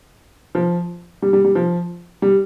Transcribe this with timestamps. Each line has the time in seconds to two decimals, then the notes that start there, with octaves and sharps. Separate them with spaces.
0.55 F3
1.22 G3
1.33 G3
1.45 G3
1.55 F3
2.22 G3